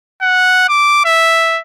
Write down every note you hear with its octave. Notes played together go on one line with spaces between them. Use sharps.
F#5
D6
E5